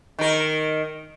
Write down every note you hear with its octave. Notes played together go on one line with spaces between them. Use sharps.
D#3 A#4